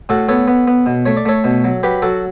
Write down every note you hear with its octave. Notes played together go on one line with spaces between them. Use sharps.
A2 F#4 A4
B3 A4 C#5
B3
B3
B2
A3 C#5
D5
A3 A4 C#5
B2
F#3
F#3 G4 B4
F#3 F#4 A4